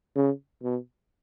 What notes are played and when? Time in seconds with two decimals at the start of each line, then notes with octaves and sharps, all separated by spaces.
0.16 C#3
0.63 B2